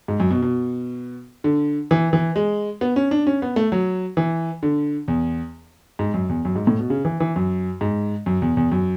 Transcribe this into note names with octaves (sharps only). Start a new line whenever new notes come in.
G#2
F#2
B2
B2
D3
E3
E3
G#3
B3
C#4
D4
C#4
B3
A3
F#3
E3
D3
E2
G#2
F#2
E2
F#2
G#2
A2
B2
C#3
E3
E3
F#2
G#2
F#2
E2
E2
F#2